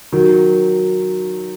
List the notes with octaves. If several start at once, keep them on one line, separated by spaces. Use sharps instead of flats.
D#3 F#3